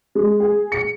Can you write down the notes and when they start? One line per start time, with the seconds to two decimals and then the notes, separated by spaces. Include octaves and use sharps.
0.15 G#3
0.40 G#4
0.72 C#7